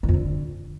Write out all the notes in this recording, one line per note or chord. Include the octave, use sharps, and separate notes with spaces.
E3
F2
D3